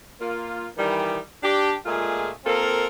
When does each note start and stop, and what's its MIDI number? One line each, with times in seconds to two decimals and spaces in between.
0.21 0.66 58
0.21 0.66 65
0.77 1.19 51
0.77 1.19 52
0.77 1.19 55
1.42 1.73 62
1.42 1.73 67
1.86 2.29 46
1.86 2.29 56
1.86 2.29 57
1.86 2.29 65
1.86 2.29 68
2.45 2.87 58
2.45 2.87 60
2.45 2.87 65
2.45 2.87 69
2.45 2.87 70